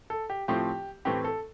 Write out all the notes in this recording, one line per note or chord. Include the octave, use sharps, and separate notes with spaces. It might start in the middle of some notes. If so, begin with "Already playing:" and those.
A4
G4
A2 F3 A3 C4 G4
A2 E3 A3 C4 G4
A4